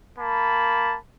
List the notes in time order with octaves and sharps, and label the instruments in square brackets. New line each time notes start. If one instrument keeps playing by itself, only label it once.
[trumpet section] A#3 A5 B5